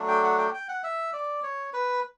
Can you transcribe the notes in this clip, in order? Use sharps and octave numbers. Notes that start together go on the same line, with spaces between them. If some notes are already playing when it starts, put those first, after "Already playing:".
Already playing: F#3 A3 D4
G5
F#5
G5
G5
F#5
E5
D5
C#5
B4